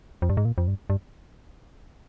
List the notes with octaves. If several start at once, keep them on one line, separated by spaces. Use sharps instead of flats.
F2
G2
G#2
A#2
F2
G2
G2